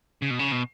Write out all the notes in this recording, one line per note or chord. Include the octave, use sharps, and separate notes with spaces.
C#3
B2
C#3
B2